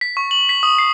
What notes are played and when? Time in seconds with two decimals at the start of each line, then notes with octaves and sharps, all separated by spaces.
0.01 B6
0.17 C#6
0.31 F#7
0.49 B6
0.63 D#6
0.79 C7